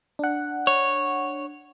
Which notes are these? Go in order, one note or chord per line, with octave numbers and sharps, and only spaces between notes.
D4 F#5
C#5